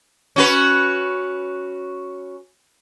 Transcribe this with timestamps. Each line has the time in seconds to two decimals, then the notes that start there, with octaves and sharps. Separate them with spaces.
0.36 C#4 F#4 B4